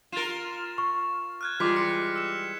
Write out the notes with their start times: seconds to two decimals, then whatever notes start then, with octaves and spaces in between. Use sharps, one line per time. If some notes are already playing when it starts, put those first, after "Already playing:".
0.12 F4 A#4 A6 E7
0.78 C#6
1.41 F6 F#6 G#6
1.60 E3 G3 G#3 F4 C6 D6 B6
1.77 C#7
2.16 E6 E7